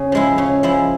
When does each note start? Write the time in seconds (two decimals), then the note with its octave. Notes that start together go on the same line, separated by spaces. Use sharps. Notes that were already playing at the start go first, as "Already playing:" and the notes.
Already playing: C#3
0.12 F3 G#3 E4
0.38 C#3
0.63 F3 G#3 E4